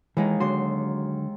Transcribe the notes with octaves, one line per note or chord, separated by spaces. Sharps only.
D#2 E3 G#3 D#4
D3 F#3 F#4 C6